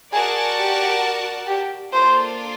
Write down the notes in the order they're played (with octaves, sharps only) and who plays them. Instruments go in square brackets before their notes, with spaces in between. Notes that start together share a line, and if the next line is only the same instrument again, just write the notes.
[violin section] F#4 A#4 D5 F#5 A5 [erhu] G#4
[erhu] G4
G4
[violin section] A#3 D4 F4 A4 [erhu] C5